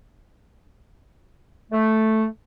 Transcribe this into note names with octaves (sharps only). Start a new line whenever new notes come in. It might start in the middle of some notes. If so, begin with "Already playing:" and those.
A3